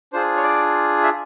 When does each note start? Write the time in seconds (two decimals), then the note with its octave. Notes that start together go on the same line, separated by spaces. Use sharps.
0.13 D4 F4 G#4 C5
0.37 C#5
0.43 D5
1.04 E5